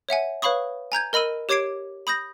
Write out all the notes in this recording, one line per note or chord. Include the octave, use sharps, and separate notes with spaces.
C#5 E5 F#5 G#5
B4 C#5 F5 B5 C#6 D#6
G#5 A#5 G6 G#6
A#4 D#5 B5 E6 D#7
G4 C#5 D6 G#6 C7 D7
B5 D#6 G6 A#6